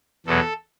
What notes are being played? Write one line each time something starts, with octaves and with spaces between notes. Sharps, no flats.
E2 B2 F#3 A4